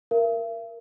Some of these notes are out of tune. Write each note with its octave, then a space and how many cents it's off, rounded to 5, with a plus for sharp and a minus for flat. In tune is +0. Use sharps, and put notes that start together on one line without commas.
A#4 +0 E5 +45